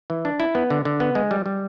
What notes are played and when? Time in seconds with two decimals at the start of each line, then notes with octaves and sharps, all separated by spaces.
0.10 E3
0.25 D4
0.40 E4
0.55 B3
0.70 D3
0.85 D3
1.00 B3
1.15 G#3
1.31 G3
1.46 G3